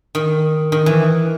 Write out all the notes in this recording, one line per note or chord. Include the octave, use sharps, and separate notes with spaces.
D#3
D#3
E3